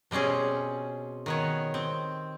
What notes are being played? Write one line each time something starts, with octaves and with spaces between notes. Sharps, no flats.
B2 G3 C4 C#4 G#4
D#3 B3 C#5
C4